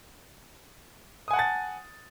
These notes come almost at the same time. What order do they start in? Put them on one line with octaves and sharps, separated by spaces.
D#6 G#5 F#5 A5 A6